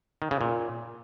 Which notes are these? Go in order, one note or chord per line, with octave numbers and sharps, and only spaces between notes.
D#3
C#3
A#2